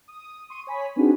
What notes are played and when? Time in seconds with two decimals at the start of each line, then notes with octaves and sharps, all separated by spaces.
0.08 D#6
0.50 C6 C#6 D#7
0.67 C#5 G#5 B5 B6
0.96 B3 C4 D4 D#4 F#4 G#4